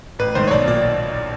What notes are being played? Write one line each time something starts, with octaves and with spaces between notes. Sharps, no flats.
A1 B4
G#2 D#3 C5
C#5
B1 D5
A#2 D5